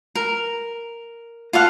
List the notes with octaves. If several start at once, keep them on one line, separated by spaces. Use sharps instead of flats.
A#4
F4 A4 F5 F#5